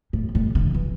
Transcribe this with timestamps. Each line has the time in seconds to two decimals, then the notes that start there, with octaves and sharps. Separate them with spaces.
0.13 A2
0.35 A2
0.55 D3
0.74 E3